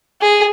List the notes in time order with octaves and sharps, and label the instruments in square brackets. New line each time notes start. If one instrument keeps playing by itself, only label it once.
[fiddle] G#4